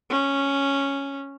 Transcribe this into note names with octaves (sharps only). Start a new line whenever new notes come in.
C#4